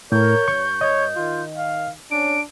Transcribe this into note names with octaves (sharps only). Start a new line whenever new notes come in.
A2 A#4 C#5 G6
G2 C#6
C#5 D#5
D#3 F4
F5
C#4 D4 D7